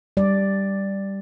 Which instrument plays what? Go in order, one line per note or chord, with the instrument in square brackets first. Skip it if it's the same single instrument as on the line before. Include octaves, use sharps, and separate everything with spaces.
[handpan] G3 D5